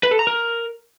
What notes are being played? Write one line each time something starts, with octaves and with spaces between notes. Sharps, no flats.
B4
A4
A#5
A#4